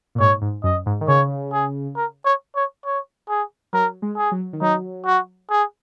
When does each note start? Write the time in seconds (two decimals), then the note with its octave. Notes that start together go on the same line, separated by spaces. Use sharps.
0.15 A#2
0.19 G#2 C#5
0.42 G#2
0.64 F#2 D#5
0.86 G#2
1.01 D#3
1.08 C#3 C#5
1.52 G#4
1.96 A#4
2.25 C#5
2.56 C#5
2.85 C#5
3.29 G#4
3.73 F#3 A#4
4.02 G#3
4.17 G#4
4.32 F#3
4.53 D#3
4.61 F#3 D#4
5.05 F#4
5.50 G#4